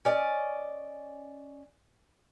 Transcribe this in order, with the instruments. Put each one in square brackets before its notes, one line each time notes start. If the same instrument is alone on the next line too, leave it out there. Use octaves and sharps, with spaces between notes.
[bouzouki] C#4 D5 D#5